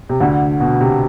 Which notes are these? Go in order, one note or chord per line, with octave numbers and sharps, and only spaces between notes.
C3
D2 D3
B2
C3